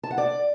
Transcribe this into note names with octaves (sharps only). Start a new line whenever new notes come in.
A5
F#5
D5